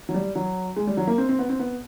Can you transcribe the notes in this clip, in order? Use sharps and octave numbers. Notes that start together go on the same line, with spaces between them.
F#3
G3
F#3
G#3
G3
F#3
A#3
C4
C4
B3
C4
B3